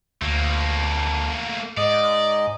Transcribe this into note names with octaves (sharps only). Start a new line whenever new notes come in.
D2 A3 A#3
G#2 D5 D#5